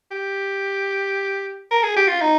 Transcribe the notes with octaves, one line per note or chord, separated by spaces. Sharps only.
G4
A#4
G#4
G4
F4
D#4